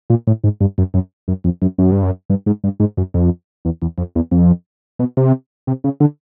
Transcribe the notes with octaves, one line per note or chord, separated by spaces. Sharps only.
A#2
A2
G#2
G2
F#2
F#2
F#2
F2
F#2
F#2
G2
F#2
G2
G#2
G2
G#2
F#2
F2
E2
E2
F2
E2
F2
B2
C3
C3
C#3
D3